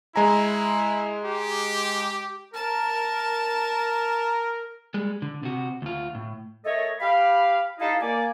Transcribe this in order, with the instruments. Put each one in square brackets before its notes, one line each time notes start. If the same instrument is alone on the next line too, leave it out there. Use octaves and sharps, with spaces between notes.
[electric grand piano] G#3 G#5 A#5 [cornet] E4
[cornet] G4
[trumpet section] A#4 [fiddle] A5
[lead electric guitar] G3 G#3
D3
C3 F#4
D2 F4
A2
[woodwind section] A3 A4 A#4 C#5 D#5
G4 F5 B5
D#4 E4 G4 A4 D#5 F5
A#3 D5 G#5